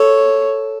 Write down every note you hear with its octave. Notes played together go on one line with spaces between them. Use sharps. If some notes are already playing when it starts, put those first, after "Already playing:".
Already playing: A4 C#5